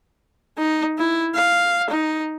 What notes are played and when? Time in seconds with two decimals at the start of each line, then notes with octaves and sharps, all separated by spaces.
0.58 D#4
0.98 E4
1.35 F5
1.90 D#4